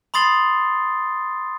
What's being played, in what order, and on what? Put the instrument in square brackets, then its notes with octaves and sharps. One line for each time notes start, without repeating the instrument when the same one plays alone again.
[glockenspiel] B5 C6 D#6 A6 C7 G7